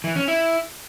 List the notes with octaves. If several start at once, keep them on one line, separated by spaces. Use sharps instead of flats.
E3
C#4
E4